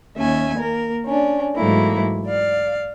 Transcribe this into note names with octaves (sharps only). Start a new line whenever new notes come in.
D#2 C#4 E5 G#5
A#3 A#4
C#4 D4
G#2 E3 F#3 A3 A#3 E4
D5 F5